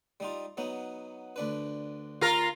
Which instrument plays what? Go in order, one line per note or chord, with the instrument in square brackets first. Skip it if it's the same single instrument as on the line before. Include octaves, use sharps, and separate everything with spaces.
[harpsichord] G3 D#4 F4
F#3 B3 D#4
D2 D4 B4
[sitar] F4 A#4